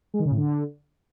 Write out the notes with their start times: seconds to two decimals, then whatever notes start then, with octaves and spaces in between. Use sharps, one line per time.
0.14 G#3
0.20 D#3
0.25 C#3
0.31 A2
0.37 D3